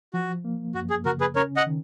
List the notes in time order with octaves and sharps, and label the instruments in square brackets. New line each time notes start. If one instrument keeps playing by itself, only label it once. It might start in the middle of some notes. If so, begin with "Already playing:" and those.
[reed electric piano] F3 [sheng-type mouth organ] F#4
[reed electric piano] A#3
[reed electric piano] F#2 [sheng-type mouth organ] F#4
[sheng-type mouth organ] G#4
[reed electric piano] C#3 [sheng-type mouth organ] F#4 A#4
[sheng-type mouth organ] G#4 B4
[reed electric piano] C#4 [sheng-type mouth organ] A#4 C#5
[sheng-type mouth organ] D#5 F#5
[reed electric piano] D#3